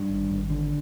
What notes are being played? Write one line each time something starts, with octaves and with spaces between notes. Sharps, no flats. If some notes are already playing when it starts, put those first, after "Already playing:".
Already playing: G2
G#1
G#1
D3